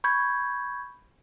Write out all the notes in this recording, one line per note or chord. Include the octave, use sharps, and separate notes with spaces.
B5 C#6 G6 G#6